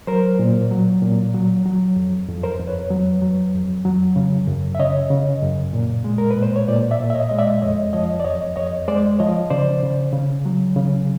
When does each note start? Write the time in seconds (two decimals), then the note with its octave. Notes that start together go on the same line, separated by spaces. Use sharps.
0.07 F#3 A#4 C5
0.39 A#2
0.71 F#3
1.02 A#2
1.34 F#3
1.66 F#3
1.96 F2
2.28 F2
2.44 A#4 C5
2.59 F2
2.67 B4 C#5
2.90 F#3
3.22 F#3
3.54 F2
3.85 F#3
4.16 C#3
4.47 F#2
4.75 E5
4.80 C#3 C#5 D#5
5.10 C#3
5.43 F#2
5.73 A#2
6.04 G#3
6.18 A#4
6.31 B4
6.36 A#2
6.43 C5
6.56 C#5
6.68 A#2 C5 D5
6.91 D5 E5
7.00 A#2
7.10 E5
7.14 C#5 D#5
7.29 G#3 D#5
7.39 D5 E5
7.62 F2 C#5 D#5
7.93 F3 C#5 D#5
8.20 D5
8.24 F2 C#5 D#5
8.56 F2 C#5 D#5
8.88 G#3 C5 D5
9.19 F3 C#5 D#5
9.50 C#3 C5 D5
9.83 C#3
10.13 C#3
10.46 F#3
10.76 C#3